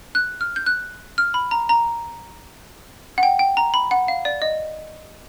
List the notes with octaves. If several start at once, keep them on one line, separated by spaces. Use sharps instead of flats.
F#6
F6
G6
F#6
F6
B5
A#5
A#5
F#5
G5
G5
A#5
B5
F#5
F5
D5
D#5